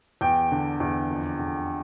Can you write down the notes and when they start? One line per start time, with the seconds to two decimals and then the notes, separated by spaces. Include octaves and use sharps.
0.21 E2 G5
0.52 D3
0.80 E2
1.10 F2
1.39 D3